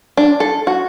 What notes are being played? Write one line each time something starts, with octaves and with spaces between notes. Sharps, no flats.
D4
A4
F#4